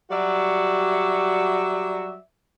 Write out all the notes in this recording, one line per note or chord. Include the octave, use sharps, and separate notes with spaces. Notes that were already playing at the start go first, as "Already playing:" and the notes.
F#3 G3 F#4 D5 E5